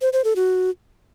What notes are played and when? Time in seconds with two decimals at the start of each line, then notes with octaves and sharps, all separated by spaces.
0.02 C5
0.13 C5
0.24 A4
0.36 F#4